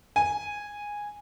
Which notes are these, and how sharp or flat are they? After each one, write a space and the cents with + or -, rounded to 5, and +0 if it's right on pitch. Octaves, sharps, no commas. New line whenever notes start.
G#5 -10